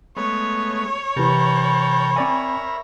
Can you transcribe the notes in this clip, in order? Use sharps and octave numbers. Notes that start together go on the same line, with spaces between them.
G#3 A3 B3 C#5
C3 E3 A#4 G5 A5 B5
C4 A#4 D5 E5 G#5